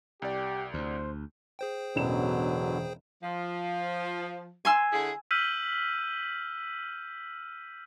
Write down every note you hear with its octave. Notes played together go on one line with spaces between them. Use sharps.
C2 G4 D5
D2 C5
G#4 C5 G5
E1 A1 B2 D3 F#3 E7
F3
G#5 C6 E6
D3 E4 G#4
E6 F6 G6 B6 D#7 F#7